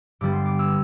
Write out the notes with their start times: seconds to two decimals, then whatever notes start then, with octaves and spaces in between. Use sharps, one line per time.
0.21 G2 D3 G3 B3 D6
0.33 C6
0.45 D6
0.59 E6